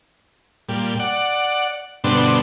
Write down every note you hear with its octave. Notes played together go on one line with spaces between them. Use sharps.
A#2 G3
D5 F#5
G2 B2 D3 B3 C4 D4